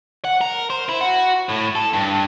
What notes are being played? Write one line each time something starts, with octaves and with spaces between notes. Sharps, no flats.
F#5
A#4
C5
E4
F#4
A2
A4
G2